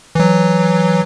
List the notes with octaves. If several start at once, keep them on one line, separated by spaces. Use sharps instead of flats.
E3 F#3